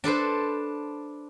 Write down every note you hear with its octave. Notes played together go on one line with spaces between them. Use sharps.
D4 A4 B4 C5